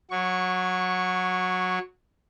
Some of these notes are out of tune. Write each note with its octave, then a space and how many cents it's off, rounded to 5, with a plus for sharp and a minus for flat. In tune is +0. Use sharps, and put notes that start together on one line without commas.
F#3 -15 C#6 +5